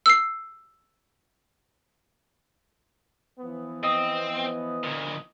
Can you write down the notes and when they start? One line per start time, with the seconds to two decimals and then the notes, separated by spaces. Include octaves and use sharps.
0.06 E6 C7
3.40 E3 F3 B3
3.83 C4 D#5 D#6
4.84 D2 A#2